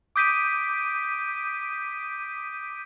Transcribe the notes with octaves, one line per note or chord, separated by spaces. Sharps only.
D6 D#6 G6 B6 D7 D#7